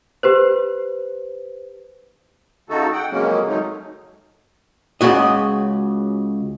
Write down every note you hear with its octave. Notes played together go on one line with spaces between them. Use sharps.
G4 B4 C5
C#3 A3 D#4 F#4 A4
F#5 G5
F2 C#3 F#3 G#3 A#3 C#4
D#3 F#3 G#3 A3 D#4
C#2 A#2 C#3 F#4 D#5